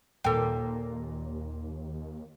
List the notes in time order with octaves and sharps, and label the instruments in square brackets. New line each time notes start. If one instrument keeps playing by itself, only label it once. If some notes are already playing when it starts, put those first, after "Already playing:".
[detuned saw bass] D#2 [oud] A#2 [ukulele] A4 G5